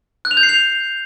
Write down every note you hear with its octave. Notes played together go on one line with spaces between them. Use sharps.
F#6
F7
G6
C7
F7